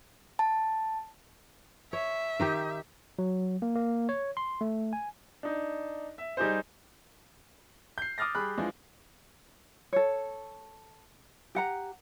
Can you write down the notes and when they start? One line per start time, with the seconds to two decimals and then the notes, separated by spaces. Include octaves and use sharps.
0.39 A5
1.93 C#5 E5
2.40 D#3 D#4 G4
3.19 F#3
3.62 A#3
3.76 A#3
4.09 C#5
4.37 C6
4.61 A3
4.93 G#5
5.43 D4 D#4
6.18 E5
6.37 G3 D#4 G4 G#4 C5
7.98 G6 C7
8.18 D6 D#6 F6 A6 A#6
8.35 G3 G#4 B5 F#6
8.57 E3 F3 G#3 D4
9.93 A4 C#5
11.55 G4 F#5 A#5